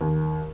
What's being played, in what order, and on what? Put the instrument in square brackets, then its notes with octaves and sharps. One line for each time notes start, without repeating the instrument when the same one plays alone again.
[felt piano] D#2